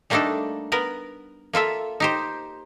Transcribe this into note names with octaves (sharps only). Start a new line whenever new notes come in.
G3 A3 A#3 D4 D#4 A4
B3 A#4
A#3 F4 A4 E5
D#4 G4 C5